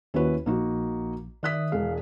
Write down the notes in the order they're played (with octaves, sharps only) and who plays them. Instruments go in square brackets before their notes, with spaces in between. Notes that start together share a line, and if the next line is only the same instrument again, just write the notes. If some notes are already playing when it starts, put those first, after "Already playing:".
[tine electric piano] D#2 F#4 [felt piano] C#4 E4 B4
[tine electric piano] A#1 [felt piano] A#3 D#4 F#4
[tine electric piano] D#3 E5 D#6 [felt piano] D5 F#6 B6
[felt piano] E1 G#3 [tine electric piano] F5